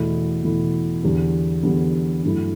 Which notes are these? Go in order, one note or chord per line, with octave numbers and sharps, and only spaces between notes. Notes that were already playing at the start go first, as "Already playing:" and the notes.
Already playing: E2 B2 A3 E4
E2 B2 A3 E4
E2 D3 G3 B3
E2 D3 G3 B3
G2 F#3 A3 E4